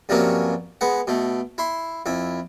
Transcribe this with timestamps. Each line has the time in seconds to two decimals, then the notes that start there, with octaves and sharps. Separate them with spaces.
0.09 G2 C3 F3 F#3 A#3 C#4
0.81 G#3 B3 F#5
1.07 B2 A3
1.58 E4 C6
2.06 F2 E4